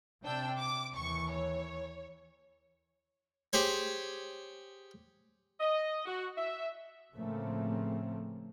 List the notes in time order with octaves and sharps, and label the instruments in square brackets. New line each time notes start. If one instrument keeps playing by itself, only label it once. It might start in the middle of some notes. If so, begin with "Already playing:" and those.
[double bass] C3 [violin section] D4 G5 E6
[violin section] D6
[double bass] D#2 E3 [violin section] C#6
[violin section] C#5
[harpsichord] G4 G#4 C5 C#5
[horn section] D#5
F#4
E5
[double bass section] A2 C#3 F3 A3 A#3 C4